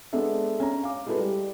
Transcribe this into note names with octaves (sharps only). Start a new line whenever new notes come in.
G#3 B3 D4 A4 E5
C#4 A#5
F5 D6
G#3 E4 F#4 A4 B4
G3